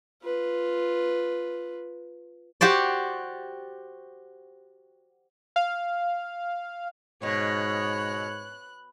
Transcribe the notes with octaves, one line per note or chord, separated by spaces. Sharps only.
F4 B4
F#4 G4 C5 D5
F5
G#2 B2 C#5 F#6